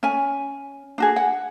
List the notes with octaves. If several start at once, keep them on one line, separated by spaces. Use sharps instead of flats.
C#4 G#5
D4 F#4 G#4
F#5